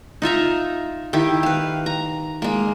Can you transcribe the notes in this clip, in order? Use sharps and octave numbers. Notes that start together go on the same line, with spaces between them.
D#4 F4 E5 A#5
D#3 E4 G4
B4 F5
A#5
G#3 A#3